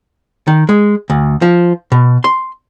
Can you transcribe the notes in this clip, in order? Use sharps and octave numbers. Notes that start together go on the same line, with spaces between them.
D#3
G#3
D2
F3
B2
C6